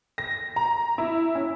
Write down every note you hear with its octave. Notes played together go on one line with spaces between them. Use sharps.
A#6
A#5
E4
C#4